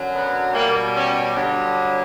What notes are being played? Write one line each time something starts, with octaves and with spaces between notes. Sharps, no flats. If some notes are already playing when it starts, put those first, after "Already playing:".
Already playing: F#2 D3 F#3
B3
B2 G3 A#3
C#4
G2 D3 F#3